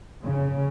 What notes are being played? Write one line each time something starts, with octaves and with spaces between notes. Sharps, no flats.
C#3